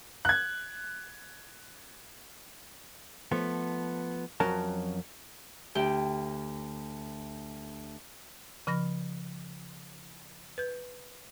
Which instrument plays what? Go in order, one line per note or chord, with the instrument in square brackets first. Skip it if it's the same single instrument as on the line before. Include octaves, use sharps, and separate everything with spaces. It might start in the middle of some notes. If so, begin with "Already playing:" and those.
[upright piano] F#6 G#6
[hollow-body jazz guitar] F3 A3 B3
F2 F#3 C#4 A#4 A5
[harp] D2 G4 G5
[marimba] C#3 F3 B5 F6 A#6
B4 G6